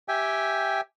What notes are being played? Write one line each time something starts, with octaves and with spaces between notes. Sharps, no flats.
G4 E5 G5 G#5